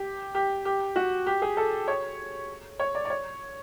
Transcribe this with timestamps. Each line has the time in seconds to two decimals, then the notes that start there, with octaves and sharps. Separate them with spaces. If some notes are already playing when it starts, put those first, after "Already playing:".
Already playing: G4
0.35 G4
0.65 G4
0.96 F#4
1.26 G4
1.42 G#4
1.57 A4
1.88 C#5
2.79 C#5
2.95 D5
3.05 D5
3.10 C#5